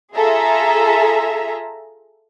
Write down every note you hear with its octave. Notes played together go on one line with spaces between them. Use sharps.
F4 G#4 A4 E5 A#5